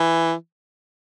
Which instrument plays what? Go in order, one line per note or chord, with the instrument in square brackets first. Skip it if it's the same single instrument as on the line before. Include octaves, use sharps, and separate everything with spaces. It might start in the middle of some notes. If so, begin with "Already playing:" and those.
Already playing: [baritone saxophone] E3